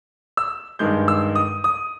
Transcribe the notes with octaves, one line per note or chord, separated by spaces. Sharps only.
E6
G2 D#3 G#3 G6
E6
D#6
D#6